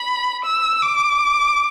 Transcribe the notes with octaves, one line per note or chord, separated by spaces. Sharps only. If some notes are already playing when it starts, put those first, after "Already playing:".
Already playing: B5
E6
D6